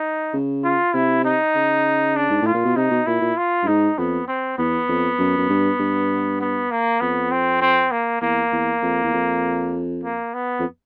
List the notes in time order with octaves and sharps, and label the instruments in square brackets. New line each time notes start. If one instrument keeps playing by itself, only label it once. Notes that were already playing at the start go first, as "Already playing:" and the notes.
Already playing: [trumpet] D#4
[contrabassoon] C#3
[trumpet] F4
[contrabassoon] C3 [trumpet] E4
[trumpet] D#4
[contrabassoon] C#3
[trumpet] D4
[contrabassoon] G#2
[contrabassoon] A2 [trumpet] F4
[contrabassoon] A#2
B2
[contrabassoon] C3 [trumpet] D#4
[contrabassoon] B2
[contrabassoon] A#2 [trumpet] E4
[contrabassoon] A#2
[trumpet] F4
[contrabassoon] G2
[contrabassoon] G#2 [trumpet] D#4
[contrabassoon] F2 [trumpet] B3
[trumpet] C4
[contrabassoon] E2 [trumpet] B3
[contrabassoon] F2
F#2
F#2
G2
G2
[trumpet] B3
A#3
[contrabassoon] F2 [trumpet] B3
[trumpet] C4
C4
A#3
[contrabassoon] E2 [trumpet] A#3
[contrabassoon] E2
F2
E2
F2
[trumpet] A#3
B3
[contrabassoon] F2